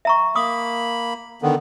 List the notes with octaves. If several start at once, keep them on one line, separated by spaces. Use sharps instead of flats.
E5 A#5 C#6
A#3 B5 D6 D#6
D3 D#3 B3